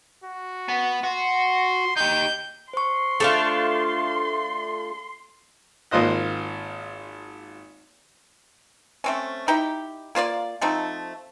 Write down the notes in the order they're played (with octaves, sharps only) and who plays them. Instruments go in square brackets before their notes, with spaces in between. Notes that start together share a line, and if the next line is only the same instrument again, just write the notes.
[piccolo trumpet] F#4
[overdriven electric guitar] B3
[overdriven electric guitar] F#4 [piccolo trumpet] C6
[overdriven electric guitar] D#4 G4 [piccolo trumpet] G6
[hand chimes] C5 C#6 [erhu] C6
[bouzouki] A3 D4 F4
[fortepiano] G#1 A#3 F4 C5 D#5 F#6
[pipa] A3 C4 C#4
D#4 E4 G4 G5
A#3 F4 C#5 D5
F3 A3 C4 D#4